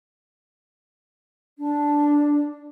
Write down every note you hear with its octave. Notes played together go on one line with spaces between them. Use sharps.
D4